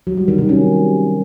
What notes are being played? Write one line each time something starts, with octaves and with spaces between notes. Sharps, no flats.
F#3
G3
D#3
C3
C#4